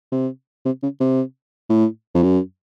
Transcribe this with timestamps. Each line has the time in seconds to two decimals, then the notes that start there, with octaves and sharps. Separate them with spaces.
0.12 C3
0.65 C3
0.83 C#3
1.00 C3
1.69 A2
2.15 F2
2.23 F#2